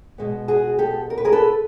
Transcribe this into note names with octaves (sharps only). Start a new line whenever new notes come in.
B2 G#3 B3
F#4 G#4
G4 A4
A#4
B4
G#4 A#4
A4 B4